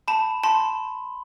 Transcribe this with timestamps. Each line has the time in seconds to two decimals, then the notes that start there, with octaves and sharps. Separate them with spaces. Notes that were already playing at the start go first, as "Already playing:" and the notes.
0.08 A5 B5
0.44 A5 C6